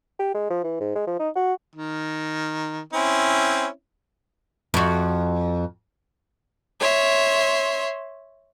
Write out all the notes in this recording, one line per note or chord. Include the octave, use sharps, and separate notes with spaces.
G4
G#3
F3
E3
G#2
G#3
F3
D#4
F#4
D#3
C4 C#4 E4
F2 F#4
C#5 E5 C6